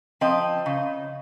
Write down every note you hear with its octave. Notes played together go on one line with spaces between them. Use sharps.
F3 C4 D#5
C#3